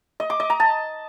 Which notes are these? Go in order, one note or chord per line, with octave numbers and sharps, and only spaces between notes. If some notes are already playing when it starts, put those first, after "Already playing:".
D#5
D6
D#5
A#5
A5